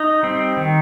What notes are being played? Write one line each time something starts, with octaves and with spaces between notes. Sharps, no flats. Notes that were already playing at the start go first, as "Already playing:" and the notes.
Already playing: D#4
G3 C4
D#3